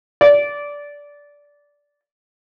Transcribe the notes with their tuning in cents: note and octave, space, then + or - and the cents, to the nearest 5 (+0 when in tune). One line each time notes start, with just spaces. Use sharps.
D5 -15